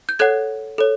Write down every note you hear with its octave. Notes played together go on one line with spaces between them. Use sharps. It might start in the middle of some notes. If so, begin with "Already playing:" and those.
G6
A4 C#5 F#5 F#6 G#6
A4 C#5